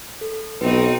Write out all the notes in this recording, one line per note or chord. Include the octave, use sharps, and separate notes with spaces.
A4
B1 C4 D#4 B4